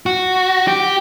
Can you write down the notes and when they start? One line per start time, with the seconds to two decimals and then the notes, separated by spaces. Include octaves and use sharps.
0.06 F#4
0.68 G4